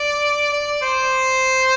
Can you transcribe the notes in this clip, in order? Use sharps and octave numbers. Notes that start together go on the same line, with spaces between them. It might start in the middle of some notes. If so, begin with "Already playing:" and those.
Already playing: D5
D5
C5